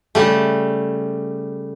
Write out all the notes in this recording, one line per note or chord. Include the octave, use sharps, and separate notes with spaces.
C#3 G3 A3